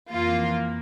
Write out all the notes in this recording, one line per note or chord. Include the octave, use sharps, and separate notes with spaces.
F2 E3 A#3 F4